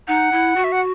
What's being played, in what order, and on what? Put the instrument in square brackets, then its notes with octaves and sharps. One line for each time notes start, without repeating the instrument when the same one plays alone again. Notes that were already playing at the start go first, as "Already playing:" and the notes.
[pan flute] D#4 [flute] F#5
[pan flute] E4
F#4
[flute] E5
F#5